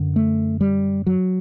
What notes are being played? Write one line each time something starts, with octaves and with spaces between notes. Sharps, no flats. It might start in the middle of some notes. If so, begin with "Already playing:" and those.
Already playing: F#2 D3
A3
G3
F#3